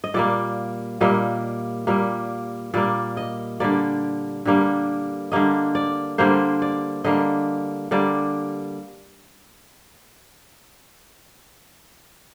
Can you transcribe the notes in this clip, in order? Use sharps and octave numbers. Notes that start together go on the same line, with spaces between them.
D#5
A#2 G3 A#3 D5
A#2 G3 A#3 D#5
A#2 G3 A#3
A#2 G3 A#3 D5
D#5
D3 G3 A#3 D5
D3 G3 A#3
D3 G3 A#3 D#5
D5
D3 G3 A#3 C5
D5
D3 G3 A#3 D#5
D3 G3 A#3 D5